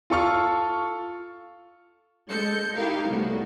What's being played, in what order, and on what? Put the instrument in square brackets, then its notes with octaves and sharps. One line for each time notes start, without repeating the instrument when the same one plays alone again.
[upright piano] F4 A4 C#6 F6
[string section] G#3 A4 G6 C#7
D#4 E4 G4 A#4 F5
C2 A2 B3 F#4